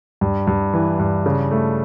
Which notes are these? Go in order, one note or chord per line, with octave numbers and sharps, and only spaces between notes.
G2
G2
E3
G2
C#3
A3